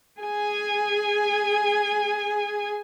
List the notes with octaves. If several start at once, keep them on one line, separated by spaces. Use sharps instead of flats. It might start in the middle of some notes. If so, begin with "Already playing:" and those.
G#4 G#5